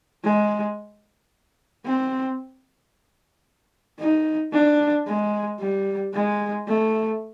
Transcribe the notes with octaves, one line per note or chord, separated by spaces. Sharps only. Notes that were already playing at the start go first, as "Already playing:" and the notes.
G#3
C4
D#4
D4
G#3
G3
G#3
A3